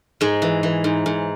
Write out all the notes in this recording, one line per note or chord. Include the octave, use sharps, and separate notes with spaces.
G#2 G#3
E3
E3
G#2
G#2